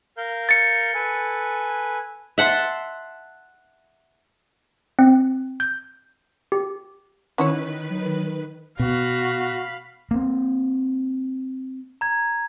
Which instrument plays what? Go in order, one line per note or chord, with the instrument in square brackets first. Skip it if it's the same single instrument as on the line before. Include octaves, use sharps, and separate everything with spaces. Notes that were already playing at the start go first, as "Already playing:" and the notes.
[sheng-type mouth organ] A#4 F5 G6
[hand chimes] A6 C#7
[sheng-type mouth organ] A4 B4 G#5
[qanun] E5 F#5 A5 C6
[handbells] C4
G6
G4
[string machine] D#3 B4 [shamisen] C#4 E4 C#5
[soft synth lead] F#3
[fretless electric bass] B2 [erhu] F#4 [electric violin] F5 B5
[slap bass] A#3 C4
[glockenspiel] A#5 G#6